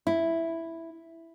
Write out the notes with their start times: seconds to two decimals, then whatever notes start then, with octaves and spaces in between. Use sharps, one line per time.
0.07 E4